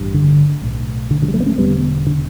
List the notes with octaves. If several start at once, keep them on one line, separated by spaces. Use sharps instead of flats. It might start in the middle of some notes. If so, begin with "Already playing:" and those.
Already playing: A1 G2
D3
B1 A2
D3
D3 F#3
G3
F#3 A3
B3
A3 C#4
E1 E2 D3 G3 B3
D3